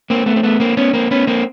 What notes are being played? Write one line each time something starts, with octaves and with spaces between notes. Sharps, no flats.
A#3 C4
A3 B3
C4
A3 B3
A#3 C4
B3 C#4
A#3 C4
B3 C#4
A#3 C4